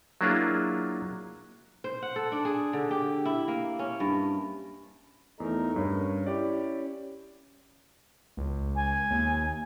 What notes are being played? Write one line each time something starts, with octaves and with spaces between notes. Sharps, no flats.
F#3 A#3 D4 E4 F4 G#4
C5
F#5
A4
D4
G#4
D3
G4
E4
A#3
C#4
G2
E2 A3 D#4 A#4
G2 C#4 A#4
E4 G4 D5
C#2
G#5
D#2